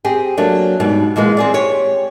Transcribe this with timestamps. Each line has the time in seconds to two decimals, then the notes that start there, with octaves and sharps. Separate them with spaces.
0.05 C4 G4 G#4
0.37 F#3 A3 A#3 D4
0.80 G#2 B2 G3
1.16 A#2 E3 G#3 B3
1.37 C4 G#4 D5
1.54 G4 C#5